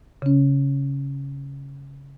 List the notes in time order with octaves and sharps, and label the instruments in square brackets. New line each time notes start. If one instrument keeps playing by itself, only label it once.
[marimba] C#3 C#4